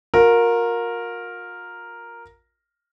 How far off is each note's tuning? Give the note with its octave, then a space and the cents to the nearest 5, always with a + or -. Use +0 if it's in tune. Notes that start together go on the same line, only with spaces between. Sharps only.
F4 +45 A#4 +0